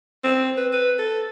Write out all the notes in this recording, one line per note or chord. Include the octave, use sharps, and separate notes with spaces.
C4
B4
B4
A4